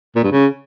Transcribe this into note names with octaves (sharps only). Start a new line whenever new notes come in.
A#2
G2
C#3